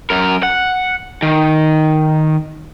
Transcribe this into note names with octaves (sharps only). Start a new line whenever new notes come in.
F#2 A#4
F#5
D#3